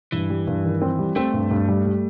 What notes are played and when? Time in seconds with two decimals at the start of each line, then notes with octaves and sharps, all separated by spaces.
0.12 G2 E3
0.30 G3
0.47 G2
0.65 D#3
0.82 C4
0.99 G3
1.16 A3 C4
1.33 G2
1.51 G2
1.68 G3
1.85 G3